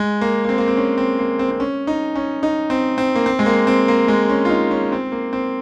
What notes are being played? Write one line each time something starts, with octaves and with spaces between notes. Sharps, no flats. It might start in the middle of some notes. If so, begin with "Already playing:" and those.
Already playing: G#3
A#3
A#3
C4
A#3
C4
C#4
C4
A#3
C4
C4
C#4
D#4
C#4
D#4
C4
C4
A#3
C4
G#3
A#3
C4
A#3
G#3
C#4
F4
D#4
C#4
C4
A#3
C4